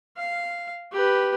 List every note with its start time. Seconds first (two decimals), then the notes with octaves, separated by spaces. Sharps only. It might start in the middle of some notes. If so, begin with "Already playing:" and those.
0.17 F5
0.92 G4 B4